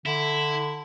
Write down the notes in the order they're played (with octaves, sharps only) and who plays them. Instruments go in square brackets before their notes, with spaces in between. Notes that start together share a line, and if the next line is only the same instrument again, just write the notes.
[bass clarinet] D3 [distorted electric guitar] E4